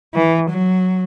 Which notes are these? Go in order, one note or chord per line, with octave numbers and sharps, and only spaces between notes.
E3
F#3